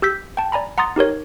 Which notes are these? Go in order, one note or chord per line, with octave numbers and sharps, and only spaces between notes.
G4 E6 G6 B6
G5 A5
D5 G#5 A#5 B5
F#5 A#5 C6 D#6 A6
D#4 G4 A#4 C#5